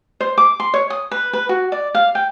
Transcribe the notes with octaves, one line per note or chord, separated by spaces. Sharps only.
C5
D6
C6
C#5
D#6
B4
B4
F#4
D5
F5
G5